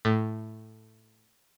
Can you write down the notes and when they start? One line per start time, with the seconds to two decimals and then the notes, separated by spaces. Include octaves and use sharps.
0.05 A2